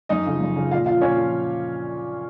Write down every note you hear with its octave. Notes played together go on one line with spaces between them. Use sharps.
F#2 D#4 D#5
C#3 F3
F#2
C#3 F3
A#2 F4 F5
F3 F4 F5
A#2 C#4 C#5
F3